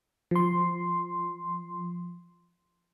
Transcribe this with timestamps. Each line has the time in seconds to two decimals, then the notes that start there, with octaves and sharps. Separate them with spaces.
0.31 F3 C6